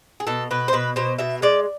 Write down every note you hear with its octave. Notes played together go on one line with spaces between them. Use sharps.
G#4
B2 A4
B2 B4
C5
B2 B4
B2 C5
B2 E5
G#3 D5